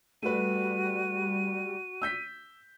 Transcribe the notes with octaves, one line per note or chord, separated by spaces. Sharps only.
G3 A3 F#4 B4 D#7
E6 G6 B6